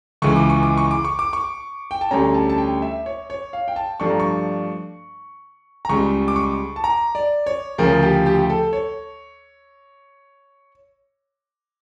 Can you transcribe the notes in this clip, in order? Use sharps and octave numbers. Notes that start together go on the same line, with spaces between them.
C#2 C#3 E3 C#6
D6
C#6
D6
C#6
D6
C#6
D6
C#6
G5
A5
D2 D3 G3 C#4 A#5
A5
A5
G5
E5
C#5
C#5
F5
G5
A5
G2 F3 A3 D4 C#6
A#5
C#6
A#5
C#2 C#3 G3 C#6
D6
C#6
A5
A#5
D5
C#5
D2 C#3 F3 A#4
G4
G4
G4
A4
C#5